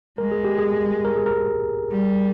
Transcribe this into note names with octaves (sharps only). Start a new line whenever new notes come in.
G#3 A#4
G#4
G4
G#4
A#4
G#4
A#4
G3